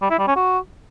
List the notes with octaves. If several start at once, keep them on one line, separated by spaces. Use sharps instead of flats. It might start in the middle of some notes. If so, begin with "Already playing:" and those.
G3
E4
G3
C#4
F#4